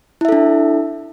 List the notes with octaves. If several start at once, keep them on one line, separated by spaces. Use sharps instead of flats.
D4 E4 A4 E5